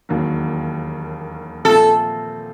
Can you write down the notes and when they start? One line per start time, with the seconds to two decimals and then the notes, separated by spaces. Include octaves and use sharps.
0.09 E1 D#2 D#3 F#3 A#3
1.65 A#2 F3 A3 C4 F4 A4